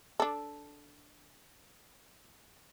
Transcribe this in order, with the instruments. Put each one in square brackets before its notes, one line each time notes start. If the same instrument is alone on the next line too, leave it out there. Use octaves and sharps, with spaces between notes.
[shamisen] D4 A4